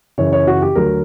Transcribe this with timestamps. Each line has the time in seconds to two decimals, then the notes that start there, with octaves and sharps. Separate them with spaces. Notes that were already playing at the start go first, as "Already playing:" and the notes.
0.18 F#2 C#3 E3 C#5
0.33 C#5
0.47 F#4
0.62 G4
0.75 D2 D3 F#3 A#4